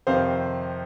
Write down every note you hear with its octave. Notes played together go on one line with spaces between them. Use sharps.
F2 C3 D#3 C4 C5 F5